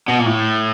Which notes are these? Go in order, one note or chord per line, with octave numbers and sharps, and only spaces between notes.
B2
A#2
A2